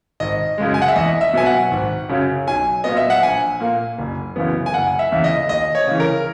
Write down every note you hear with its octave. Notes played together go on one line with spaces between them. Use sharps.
G#1 D#5
F#2 C#3 G#3
G#5
F#5
E5
E2 D#5
E5
B2 F#3 B3 G#5
F#5
G#1
F#2 C#3 F#3
B1 G#5
A#2 F#3 B3 D#5
E5
F#5
A#1 G#5
A#2 A#3
F#1
F#2 C#3 E3 B3
G#5
F#1 F#5
E5
E2 C#3
D#5
D#2 D#5
C#5
C#3 E3
A#4